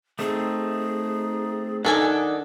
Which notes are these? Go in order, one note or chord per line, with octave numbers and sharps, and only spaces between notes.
A3 C4 D#4 G#4
D#3 D4 D#4 A4 F#5 G#5